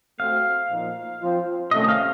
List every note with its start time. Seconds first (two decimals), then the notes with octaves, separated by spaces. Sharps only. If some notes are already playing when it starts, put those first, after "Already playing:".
0.19 A3 C4 F#4 C5 F5
0.70 A#2 F3 A#3 D#4
1.22 F3 C4 F4 C5
1.71 C3 D#3 A3 C#4 D#5
1.89 F5